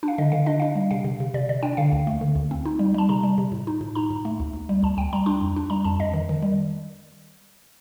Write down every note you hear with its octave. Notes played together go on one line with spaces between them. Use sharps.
D4
F5
D3 D#5
D3 F5
D4 D#5
D4 F5
G3
C3 F5
C3
C3
C3 D5
C3 D5
D4 G5
D3 F5
D2
A3
D3
D2
C4
D#4
G3
G3 A5
C3 A#5
G3
C3
A2
D#4
A2
D#4 A#5
A2
A3
D2
D2
G3
D2 A5
D2 G5
G3 A#5
D4 C6
F2
D4
G3 A#5
F2 A5
F2 D#5
D#3
D#3
G3